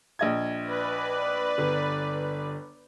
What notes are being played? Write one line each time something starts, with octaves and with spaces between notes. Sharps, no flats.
A#1 D#5 G#6
B4 D5
G1